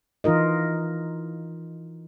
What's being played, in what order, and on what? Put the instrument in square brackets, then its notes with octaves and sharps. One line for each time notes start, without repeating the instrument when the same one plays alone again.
[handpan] E3 D#4 F4 A#4 D#5